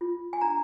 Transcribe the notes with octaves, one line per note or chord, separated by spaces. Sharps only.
F4
G#5
D4 A#5